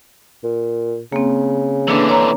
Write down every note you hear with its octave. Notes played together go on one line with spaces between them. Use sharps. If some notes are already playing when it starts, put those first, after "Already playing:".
A#2
C#3 A#3 C4
D3 E3 A#3 D4 B4
C#5 A#5